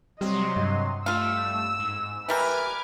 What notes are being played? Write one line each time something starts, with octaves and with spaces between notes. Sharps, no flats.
C3 F#3 G3 D#5 C6
G2
G3 A3 F4 F5 E6
G#2
E3 G3 A#4 B4 D6 F6 G#6